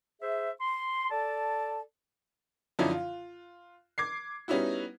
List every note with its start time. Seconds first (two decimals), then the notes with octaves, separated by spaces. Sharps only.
0.21 G#4 C5 E5
0.60 C6
1.10 A4 D5 A5
2.79 F#2 D3 F3 C#4 D#4 E4
2.91 F4
3.98 D6 G#6 C7
4.48 G3 B3 C#4 D#4 E4 F#4